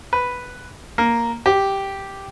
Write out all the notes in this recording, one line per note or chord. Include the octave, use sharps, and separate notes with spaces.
B4
A#3
G4